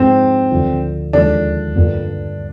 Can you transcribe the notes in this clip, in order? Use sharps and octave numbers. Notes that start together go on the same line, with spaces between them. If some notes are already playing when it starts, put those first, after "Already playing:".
Already playing: G#2 F3 G#3 C4 D4
D2 D3 F3
D#2 D3 F3 G#3 D4
G2 D3 G3 A#3 F4